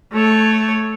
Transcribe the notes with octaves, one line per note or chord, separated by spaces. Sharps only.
A3 C#5